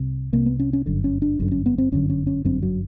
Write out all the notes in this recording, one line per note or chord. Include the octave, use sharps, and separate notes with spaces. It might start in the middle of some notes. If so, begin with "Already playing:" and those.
Already playing: C2 C3
C2 C3 A#3
B3
C#4
C#4
G1 F#2 D3
C#4
D4
G1 F#2 D3
C#4
B3
C4
G1 F#2 D3 C#4
C#4
C#4
G1 F#2 D3 C4
F#3